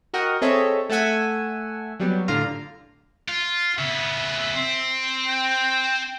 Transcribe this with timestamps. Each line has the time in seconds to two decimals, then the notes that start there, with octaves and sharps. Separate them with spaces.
0.13 F#4 A#4 D#5 F#5 G5 D#6
0.42 C4 G#4 A4 C#5 D#5 E5
0.89 A3 A4 E5 F#5 G#5 E6
2.00 F#3 G3 B3
2.28 A2 D3 F4 F5 A#5
3.28 F4
3.79 C#3 B3 E5
4.55 C4
5.26 G5